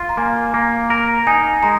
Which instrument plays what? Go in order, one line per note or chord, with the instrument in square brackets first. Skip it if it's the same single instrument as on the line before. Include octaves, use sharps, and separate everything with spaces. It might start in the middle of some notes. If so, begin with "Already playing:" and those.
Already playing: [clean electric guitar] F4
[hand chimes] A#5
[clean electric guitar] A#3 [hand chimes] G#5
[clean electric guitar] A#3
[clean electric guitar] A#4 [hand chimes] A#5
[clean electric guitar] D#4 [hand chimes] G#5
[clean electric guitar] G#3 [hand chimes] A#5